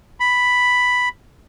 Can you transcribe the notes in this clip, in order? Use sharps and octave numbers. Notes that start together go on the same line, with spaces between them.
B5